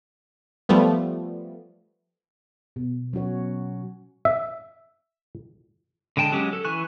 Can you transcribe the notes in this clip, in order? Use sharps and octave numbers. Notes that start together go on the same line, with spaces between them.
F3 G3 A3 B3
B2
F#3 C#4 F#4 C#5
E5
D3 G#3 G5 A5
F#3 G#3 C#4 G4
A4
E3 G#5 C#6 F#6